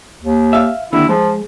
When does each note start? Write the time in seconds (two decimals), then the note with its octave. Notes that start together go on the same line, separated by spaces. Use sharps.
0.21 D#2
0.53 E5 F5
0.93 D#2 D3 E4
1.09 F3 G#3